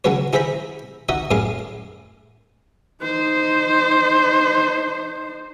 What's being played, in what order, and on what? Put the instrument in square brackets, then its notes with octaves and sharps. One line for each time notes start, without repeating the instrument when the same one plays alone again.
[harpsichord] C#3 F#3 G#3 F#4 B4 C#5
E4 G#4 C5 E5 A#5 B5
D#4 F#4 D#5 E5
F#2 A2 E4 G#4 F5 D6
[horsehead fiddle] D#4 C5